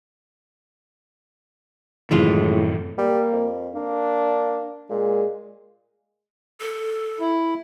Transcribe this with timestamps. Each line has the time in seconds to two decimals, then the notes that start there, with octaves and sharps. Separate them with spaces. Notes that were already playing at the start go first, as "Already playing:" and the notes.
2.11 F#2 A2 C3 D#3 E3 G#3 F4
2.98 G3 A#3
3.32 F2
3.75 A#3 D4
4.90 A#2 G#3
6.61 A4
7.20 E4